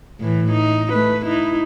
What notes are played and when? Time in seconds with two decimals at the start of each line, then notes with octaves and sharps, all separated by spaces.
0.20 A2 E3
0.52 D#4
0.92 A3 B4
1.26 D#4 E4